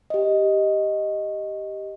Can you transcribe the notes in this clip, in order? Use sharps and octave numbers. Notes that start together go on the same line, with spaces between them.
G4 D#5